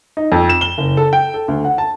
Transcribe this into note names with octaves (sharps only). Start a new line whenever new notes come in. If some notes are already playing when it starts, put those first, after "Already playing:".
D#4
F2
E7
G7
F#1
A4
G5
A4
D2
F#5
A5